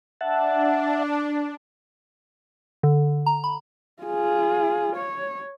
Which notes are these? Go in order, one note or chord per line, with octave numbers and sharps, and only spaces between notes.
D4 E5 F#5 A5
D3
A#5
B5
F4 G#4
C#5